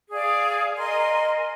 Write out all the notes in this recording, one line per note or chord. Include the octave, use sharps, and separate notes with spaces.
G#4 D5 F5
A#4 D#5 G#5 C6